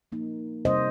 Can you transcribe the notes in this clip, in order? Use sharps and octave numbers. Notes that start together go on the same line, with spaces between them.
F3 A#3 D#4
C3 G3 C4 D#4 C5 D#5